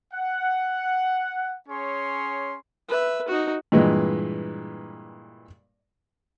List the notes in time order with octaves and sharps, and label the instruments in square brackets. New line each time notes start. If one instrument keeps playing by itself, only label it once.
[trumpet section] F#5
C#4 G#4 C#5 C6
[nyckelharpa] B4 E5
D#4 F#4
[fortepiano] G2 A#2 E3 G#3